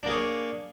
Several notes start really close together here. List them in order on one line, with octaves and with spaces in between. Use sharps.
D4 A#3 G#4 C#5